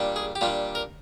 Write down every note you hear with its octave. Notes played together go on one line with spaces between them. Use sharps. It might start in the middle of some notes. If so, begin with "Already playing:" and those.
Already playing: A#2 G3 D4
G#4
G4
A#2 G3 D4 F4
A#4